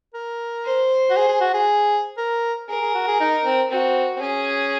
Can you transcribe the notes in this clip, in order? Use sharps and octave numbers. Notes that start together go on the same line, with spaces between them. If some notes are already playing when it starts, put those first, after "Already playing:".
A#4
C5
F#4
G#4
G#4
F#4
G#4
A#4
G#4 A#4
G#4
F#4
G#4
D#4
C4
C4 F#4
C4
C#4 G#4